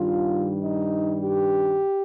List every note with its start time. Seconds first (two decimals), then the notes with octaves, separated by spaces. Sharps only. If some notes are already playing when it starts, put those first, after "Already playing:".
Already playing: G2 D#3 G3 F4
0.62 D#4
1.23 G4